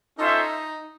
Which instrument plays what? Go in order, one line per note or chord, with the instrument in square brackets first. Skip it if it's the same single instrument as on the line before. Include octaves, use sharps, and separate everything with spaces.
[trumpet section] C#4 F4 A4 C5 E5 [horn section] D#4